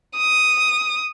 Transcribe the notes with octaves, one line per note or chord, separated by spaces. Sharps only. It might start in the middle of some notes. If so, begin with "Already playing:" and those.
D#6